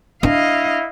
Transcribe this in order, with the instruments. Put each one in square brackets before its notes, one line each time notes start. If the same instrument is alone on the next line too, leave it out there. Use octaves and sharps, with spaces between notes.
[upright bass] D4 [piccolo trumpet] E4 [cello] D#5 F5